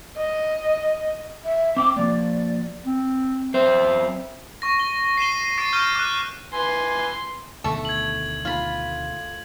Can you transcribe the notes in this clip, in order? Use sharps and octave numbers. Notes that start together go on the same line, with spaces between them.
D#5
E5
C4 F5 G5 D6
F3 A#3 D5
C4
F#2 C4 C5 E5
C#6 A#6
G7
C7 D#7 E7 G7
D6 A6 C7 D7
C#6 F6 G6 D#7 G7
D6 F#6
B4 G#5 C6
D2 B2 D#3 A3 A4
G#6 F#7
F4 B5